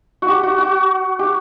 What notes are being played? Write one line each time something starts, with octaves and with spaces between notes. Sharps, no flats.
F#4
G4
F#4
F#4
G4